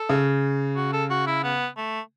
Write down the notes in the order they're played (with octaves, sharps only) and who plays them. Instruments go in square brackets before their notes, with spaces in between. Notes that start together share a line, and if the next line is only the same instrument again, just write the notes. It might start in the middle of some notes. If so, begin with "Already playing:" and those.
Already playing: [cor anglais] A4
[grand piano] C#3
[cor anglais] F#4
A4
F#4
E4
B3
A3